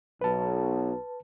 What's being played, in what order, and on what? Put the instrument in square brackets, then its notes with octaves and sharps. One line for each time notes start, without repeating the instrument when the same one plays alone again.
[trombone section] B1 [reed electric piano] B4 A5